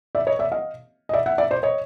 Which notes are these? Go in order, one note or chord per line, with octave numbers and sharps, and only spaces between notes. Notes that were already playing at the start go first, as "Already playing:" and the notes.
D5 E5
C#5 D#5
D5 E5
D#5 F5
D#5
D5 E5
E5 F#5
D5 E5
C5 D5
C#5 D#5